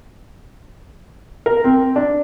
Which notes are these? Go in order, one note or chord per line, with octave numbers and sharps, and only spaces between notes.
A#4
C4
D4